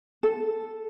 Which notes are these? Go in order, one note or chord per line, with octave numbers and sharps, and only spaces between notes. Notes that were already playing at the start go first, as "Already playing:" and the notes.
A4